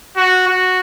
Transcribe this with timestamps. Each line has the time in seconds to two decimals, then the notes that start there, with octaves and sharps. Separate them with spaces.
0.17 F#4
0.48 F#4